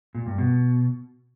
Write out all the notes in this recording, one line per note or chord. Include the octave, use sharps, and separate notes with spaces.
A#2
G2
B2